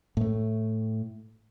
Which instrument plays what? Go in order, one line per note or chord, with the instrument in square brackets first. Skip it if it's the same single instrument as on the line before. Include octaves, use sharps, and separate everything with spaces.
[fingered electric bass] A2 A3